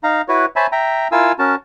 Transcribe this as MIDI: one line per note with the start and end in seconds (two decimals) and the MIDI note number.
0.03 0.22 63
0.03 0.22 77
0.03 0.22 82
0.28 0.46 64
0.28 0.46 66
0.28 0.46 71
0.28 0.46 73
0.56 0.67 72
0.56 0.67 73
0.56 0.67 76
0.56 0.67 80
0.56 0.67 81
0.56 0.67 83
0.72 1.08 76
0.72 1.08 79
0.72 1.08 82
1.12 1.32 64
1.12 1.32 65
1.12 1.32 70
1.12 1.32 77
1.12 1.32 80
1.12 1.32 88
1.39 1.55 61
1.39 1.55 66
1.39 1.55 70
1.39 1.55 81